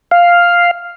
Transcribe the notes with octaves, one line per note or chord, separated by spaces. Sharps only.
F5